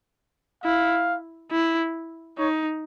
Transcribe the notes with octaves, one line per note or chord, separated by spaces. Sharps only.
E4 F5
E4
D#4 C#5